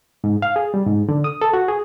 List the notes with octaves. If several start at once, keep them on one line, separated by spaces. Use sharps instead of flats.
G#2
F5
G#4
G3
G#2
D3
D#6
A4
F#4
G#4